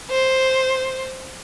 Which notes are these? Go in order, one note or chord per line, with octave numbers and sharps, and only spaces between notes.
C5